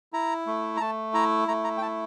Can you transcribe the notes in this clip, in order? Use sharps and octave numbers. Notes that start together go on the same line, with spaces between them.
E4 A#5
A3
A#5
A3 A5
E4 A#5
A3 A#5
A#5
G5
E4 A5